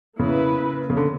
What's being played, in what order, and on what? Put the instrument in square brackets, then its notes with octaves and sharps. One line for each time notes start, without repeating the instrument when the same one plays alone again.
[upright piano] C#3 [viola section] A#3 E4 B4
[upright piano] C#3
D3